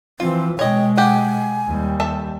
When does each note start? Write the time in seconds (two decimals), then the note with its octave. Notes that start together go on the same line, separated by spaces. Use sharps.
0.20 E3 F3 C4 F4
0.59 B2 G#3 C#5 D#5 G5
0.97 G4 F#5 G#5
1.67 D#2 G3
2.00 A4 E5